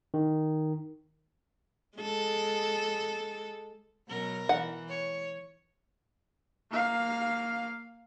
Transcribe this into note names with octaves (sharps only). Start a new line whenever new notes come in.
D#3
G#3 A4
B2 F#3 A#4
E3 F#5
C#5
A#3 F5